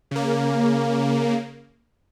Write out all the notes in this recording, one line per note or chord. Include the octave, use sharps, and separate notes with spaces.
C#3 A#3